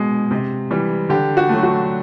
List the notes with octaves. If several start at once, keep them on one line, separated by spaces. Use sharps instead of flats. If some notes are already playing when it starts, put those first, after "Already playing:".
Already playing: B2 G#3
C3
E3 G3
D3 G4
F#4
F#3 A3
F#4